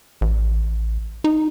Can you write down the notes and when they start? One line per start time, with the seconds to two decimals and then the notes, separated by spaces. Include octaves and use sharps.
0.21 A1
1.24 D#4